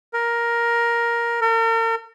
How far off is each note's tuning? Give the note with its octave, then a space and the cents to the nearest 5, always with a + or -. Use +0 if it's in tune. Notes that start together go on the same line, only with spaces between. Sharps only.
A#4 +10
A#4 -40